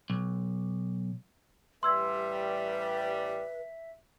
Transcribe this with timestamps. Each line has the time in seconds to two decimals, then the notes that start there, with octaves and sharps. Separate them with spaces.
0.10 B1
1.83 A1 G3 B4 E5 C6 E6 G#6